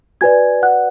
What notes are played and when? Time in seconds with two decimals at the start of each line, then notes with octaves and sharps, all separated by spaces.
0.21 F#4 B4 D5 G#5 G#6
0.62 F#5 F#6